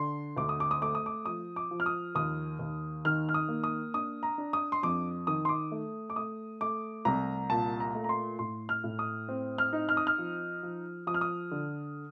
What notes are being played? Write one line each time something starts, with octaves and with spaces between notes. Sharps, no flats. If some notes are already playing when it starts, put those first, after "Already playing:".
Already playing: D3 C6
D2 D6
D#6
D6
D#6
A3 D6
D#6
D6
F3 D#6
D6
F3
F6
D#6
D#2 D#6
D#2
D#3 F6
F6
D#6
A#3
D#6
D4 D#6
A#5
D4
D#6
C6
F2 D6
D#3 D#6
C6
D6
A3
D6
A3 D#6
A3 D6
C2 A#5
A#2 A5
A#5
A3
A#5
C6
A2 C6
F6
A2
D#6
C4
F6
D#4
F6
D#6
F6
F3
F3
F3 D#6
F6
D#6
D3